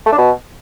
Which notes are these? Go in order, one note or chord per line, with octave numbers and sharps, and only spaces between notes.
A3
D4
B2